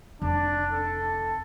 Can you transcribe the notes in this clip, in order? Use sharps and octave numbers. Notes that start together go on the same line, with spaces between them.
F1 D4
A4